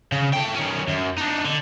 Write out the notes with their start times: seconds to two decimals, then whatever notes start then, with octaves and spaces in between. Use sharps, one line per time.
0.12 C#3
0.33 A3 G5
0.54 D#3 C#4
0.88 F#2
1.18 D4 D#4
1.45 D3